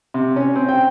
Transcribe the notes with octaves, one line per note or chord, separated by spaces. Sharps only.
C3
C#4
C4
G5